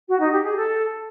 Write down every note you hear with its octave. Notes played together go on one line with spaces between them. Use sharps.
F#4
D#4
G4
G#4
A4